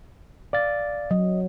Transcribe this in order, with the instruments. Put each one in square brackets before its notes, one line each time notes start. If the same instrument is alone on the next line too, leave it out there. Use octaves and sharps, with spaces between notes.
[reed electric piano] D5 F5 A6
[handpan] F#3 [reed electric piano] D#5